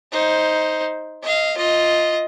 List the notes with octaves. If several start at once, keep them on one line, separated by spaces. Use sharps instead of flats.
D#4 C5
D#5 F5
F4 D#5